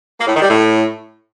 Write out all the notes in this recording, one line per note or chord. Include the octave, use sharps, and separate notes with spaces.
A#3
A2
D#3
G3
A2